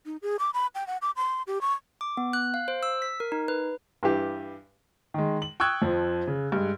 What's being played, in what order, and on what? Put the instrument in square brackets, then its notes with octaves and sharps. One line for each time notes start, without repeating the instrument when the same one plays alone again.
[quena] D#4
G#4
D6
B5
G5
F#5
D6
C6
G4
C#6
[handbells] D6
B3
F#6
F5
C5
E6
B6
A#4
D#4
B4
[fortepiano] G2 E3 G4
[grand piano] D#3 G#3
F#7
G5 C#6 D#6 E6 F#6 G#6
F2 F3
C#3
G2 G#3